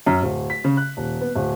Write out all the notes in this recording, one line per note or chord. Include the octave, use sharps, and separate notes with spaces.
F#2
D1
B6
C#3
F#6
D#1
B3
D1